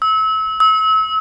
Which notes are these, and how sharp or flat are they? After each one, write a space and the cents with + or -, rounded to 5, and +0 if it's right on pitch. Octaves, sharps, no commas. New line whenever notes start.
E6 -30
E6 -35